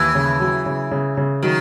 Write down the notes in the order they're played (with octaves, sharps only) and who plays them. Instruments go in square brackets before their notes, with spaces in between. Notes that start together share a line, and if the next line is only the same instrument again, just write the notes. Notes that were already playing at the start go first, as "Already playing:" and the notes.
Already playing: [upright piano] D#2 [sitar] E3
[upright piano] C#3
F#3
C#3
C#3
C#3
[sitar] D#3 [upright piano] F#3